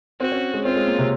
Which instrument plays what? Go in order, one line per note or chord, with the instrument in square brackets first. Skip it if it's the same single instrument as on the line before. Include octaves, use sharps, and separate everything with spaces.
[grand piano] C4 [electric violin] F#4
[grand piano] C#4
G#3
[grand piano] C4 [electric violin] F4
[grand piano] G#3
A#3
C3